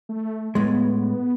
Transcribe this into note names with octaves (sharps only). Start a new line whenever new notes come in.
A3
A2 G#3 B3